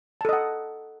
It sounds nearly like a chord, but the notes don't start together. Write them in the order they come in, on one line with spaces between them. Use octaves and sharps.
A5 A4 D#5 F#5